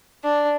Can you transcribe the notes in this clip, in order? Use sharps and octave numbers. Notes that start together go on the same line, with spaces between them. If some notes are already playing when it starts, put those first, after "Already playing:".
D4